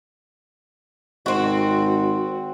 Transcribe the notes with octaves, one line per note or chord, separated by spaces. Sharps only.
G#1 C4 F#4